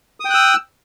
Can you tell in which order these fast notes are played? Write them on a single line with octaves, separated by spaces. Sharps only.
D#6 G5 F#6 E6